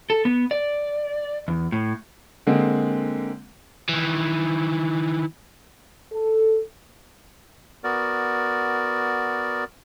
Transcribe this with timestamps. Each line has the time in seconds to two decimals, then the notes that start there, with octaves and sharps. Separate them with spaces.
0.10 A4
0.25 B3
0.51 D5
1.48 E2
1.72 A2
2.47 D3 G#3 A#3 C4
3.89 D#3 E3
6.12 A4
7.84 B3 F#4 A#4 D5